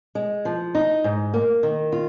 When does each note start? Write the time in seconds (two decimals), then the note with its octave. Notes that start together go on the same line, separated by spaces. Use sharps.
0.15 G#3
0.45 F3
0.75 D#4
1.04 G#2
1.34 A#3
1.63 D#3
1.92 F4